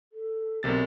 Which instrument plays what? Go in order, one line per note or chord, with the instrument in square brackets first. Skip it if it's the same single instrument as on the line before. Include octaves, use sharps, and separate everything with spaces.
[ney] A4
[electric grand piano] B1 C3 A6 [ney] A#4